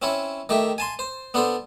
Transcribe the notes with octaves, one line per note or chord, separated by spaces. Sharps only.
C4 C#4 E4 C#5
D#3 A3 G4 E5
G#5 A5 C6
C5
B3 D4 A4 C5